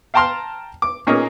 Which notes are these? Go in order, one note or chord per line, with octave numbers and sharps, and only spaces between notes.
F5 G5 A5 A#5 C6 F6
D6
A#2 A#3 C#4 D#4 G#4